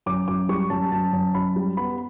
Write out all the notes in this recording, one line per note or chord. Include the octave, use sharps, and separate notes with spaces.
F#2 D6
F#2 D6
G3 C#6
F#2 A5
F#2 A5
F#2
F#2 B5
G3
B3 B5